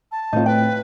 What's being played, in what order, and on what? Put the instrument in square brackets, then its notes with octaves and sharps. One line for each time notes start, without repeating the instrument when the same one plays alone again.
[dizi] A5
[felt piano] A2 C4 [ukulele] D#4 F4
[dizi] B4 [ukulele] G5